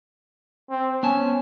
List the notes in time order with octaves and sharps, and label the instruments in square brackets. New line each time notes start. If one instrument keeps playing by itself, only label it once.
[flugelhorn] C4
[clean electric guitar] B3 G#5 A5 [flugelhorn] C#4